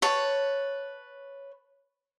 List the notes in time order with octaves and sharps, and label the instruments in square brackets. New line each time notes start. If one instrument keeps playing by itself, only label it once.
[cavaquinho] B4 C#5 A5